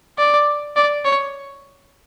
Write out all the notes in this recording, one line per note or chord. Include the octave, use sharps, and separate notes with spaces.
D5
D5
C#5